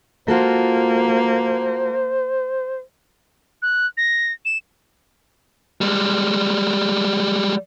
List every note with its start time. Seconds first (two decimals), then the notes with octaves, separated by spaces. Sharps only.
0.28 A#3 F4 F#4 A4 C5
3.62 F#6
3.97 A#6
4.45 E7
5.81 G3 G#3